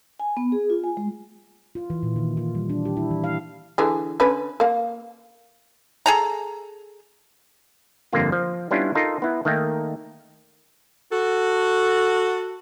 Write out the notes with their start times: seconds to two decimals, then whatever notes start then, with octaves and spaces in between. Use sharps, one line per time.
0.20 G#5
0.37 B3
0.52 G#4
0.70 F4
0.84 G#5
0.97 G#3
1.75 F4
1.90 E3
2.03 A#2
2.16 D#3
2.37 F4
2.55 G3
2.70 D4
2.85 G4
2.97 E4
3.11 E3
3.24 F5
3.78 D3 E3 G#4
4.20 D3 C#4 B4
4.60 A#3 F5
6.06 G#4 A4 A#5
8.13 G1 F2 D3 A#3 F4
8.32 F3
8.71 G3 B3 C#4 D4 E4 F4
8.95 D#4 F4 A4 A#4
9.22 B3 E4
9.45 D#3 A3 A#3 D#4 G5
11.12 F#4 A4